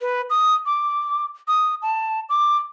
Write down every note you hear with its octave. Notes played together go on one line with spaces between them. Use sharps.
B4
D#6
D6
D#6
A5
D6